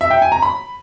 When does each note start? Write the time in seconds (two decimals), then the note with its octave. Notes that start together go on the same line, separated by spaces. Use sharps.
0.01 E5
0.11 G5
0.22 G#5
0.32 A#5
0.42 B5